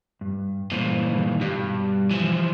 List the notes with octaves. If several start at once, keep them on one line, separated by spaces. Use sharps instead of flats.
G2
G2 A#2 E3 C5
D#3 G3 G#3
G2 B2 G3 G4
E3 F3